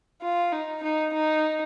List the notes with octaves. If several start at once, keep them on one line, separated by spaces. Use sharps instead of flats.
F4
D#4
D#4
D#4